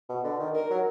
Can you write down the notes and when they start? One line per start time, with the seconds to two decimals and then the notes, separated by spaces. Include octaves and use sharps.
0.09 B2
0.24 D3
0.39 D#3
0.55 A#4
0.70 F#3